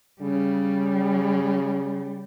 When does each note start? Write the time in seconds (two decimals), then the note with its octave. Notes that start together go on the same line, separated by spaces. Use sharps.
0.21 C#3 G3